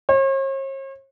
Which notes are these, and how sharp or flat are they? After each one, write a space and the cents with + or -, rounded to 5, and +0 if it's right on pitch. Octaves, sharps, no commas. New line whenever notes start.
C#5 -45